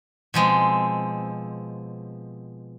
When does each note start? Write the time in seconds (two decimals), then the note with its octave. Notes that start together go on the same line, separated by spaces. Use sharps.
0.34 B2 F3 G#3 C4